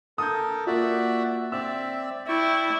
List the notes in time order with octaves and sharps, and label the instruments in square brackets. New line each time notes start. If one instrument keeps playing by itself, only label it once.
[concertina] A4 A#4 [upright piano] D#6 G6
[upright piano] A#3 F4 [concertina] F#4 D5 E5
[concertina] C4 D5 E5 [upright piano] E6
[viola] E4 [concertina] D5 G5 C#6